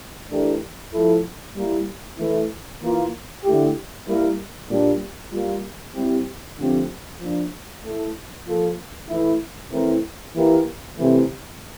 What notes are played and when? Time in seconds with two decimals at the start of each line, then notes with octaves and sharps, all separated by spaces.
0.30 E3 A3 D4 G4 A#4
0.93 F3 A3 E4 A4
1.56 G3 A#3 E4
2.18 E3 A3 E4
2.81 E3 A#3 F4
3.44 D3 A3 E4 G4
4.07 G3 A#3 E4 A#4
4.70 A#2 G3 D4
5.32 G3 A#3 F4
5.95 G3 C4 E4 G4
6.58 D3 F3 A3 C4 G4
7.20 F3 A#3 D4
7.84 A3 E4 A4
8.46 F3 A#3 F4 A4
9.09 E3 A3 E4
9.72 E3 A3 C4 E4 A#4
10.35 E3 A#3 E4 G4 A#4
10.97 C3 E3 A3